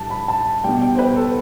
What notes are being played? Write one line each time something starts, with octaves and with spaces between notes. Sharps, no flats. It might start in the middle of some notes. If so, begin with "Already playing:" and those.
Already playing: A2 G3 A5
B5
A5
B2 G3 G5
G5
C5
B4
A4